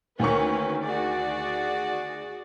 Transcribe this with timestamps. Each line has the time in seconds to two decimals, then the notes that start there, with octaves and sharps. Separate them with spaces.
0.19 D2 D#3 A#3 C#4 B4 C#6
0.84 F#4 G#4 D5